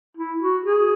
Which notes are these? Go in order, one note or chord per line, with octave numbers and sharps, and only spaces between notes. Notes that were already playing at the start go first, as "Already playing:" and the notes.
E4
F#4
G#4